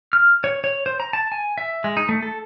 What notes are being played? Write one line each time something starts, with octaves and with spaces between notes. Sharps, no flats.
F6
C#5
C#5
C5
A#5
A5
G#5
E5
G#3
D#4
A3
A4